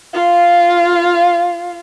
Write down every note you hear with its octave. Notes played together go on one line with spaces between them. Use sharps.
F4 F5